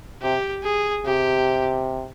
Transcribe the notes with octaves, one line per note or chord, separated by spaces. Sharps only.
C3 G4
G#4
C3 G4